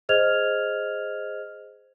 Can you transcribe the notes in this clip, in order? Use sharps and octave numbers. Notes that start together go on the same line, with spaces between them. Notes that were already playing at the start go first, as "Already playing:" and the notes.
G#4 C5 D#5 F6 G#6 F7